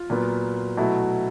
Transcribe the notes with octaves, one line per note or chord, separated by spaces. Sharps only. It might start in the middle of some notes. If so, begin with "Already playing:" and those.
Already playing: F4
A#2 F#3 B3
B2 F#3 A3 E4